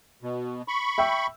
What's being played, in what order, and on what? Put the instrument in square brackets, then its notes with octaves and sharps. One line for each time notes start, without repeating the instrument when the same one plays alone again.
[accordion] B2
B5 C#6
[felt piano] E5 G5 E6